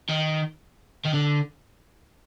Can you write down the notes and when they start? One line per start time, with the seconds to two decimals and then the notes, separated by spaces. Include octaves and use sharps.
0.09 D#3
1.05 D#3
1.13 D3